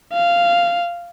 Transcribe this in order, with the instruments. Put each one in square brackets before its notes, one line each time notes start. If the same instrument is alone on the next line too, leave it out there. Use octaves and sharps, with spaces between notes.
[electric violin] F5